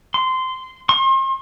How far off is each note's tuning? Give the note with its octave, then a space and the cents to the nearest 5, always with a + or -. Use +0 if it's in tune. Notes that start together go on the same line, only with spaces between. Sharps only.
C6 -15
C6 +40